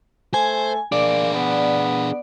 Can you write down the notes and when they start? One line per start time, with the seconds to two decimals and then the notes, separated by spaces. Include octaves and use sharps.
0.34 A3 C5 G#5
0.92 A#3 D4 G#4 D5
1.35 B3